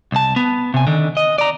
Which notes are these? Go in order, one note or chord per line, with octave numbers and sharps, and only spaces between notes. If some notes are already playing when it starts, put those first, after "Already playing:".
C2 A5
B3
C3 G#5
D3 D#3
D#5
D5 A#5